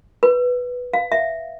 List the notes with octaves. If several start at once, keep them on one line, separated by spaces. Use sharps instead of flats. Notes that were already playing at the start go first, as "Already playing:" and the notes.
B4
F5
E5